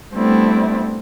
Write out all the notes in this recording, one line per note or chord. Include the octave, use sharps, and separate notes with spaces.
G3 A3 B3 C4 D4 E4